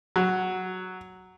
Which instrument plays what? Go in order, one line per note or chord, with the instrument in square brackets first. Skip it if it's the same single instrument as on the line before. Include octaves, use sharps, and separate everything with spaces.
[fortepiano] F#3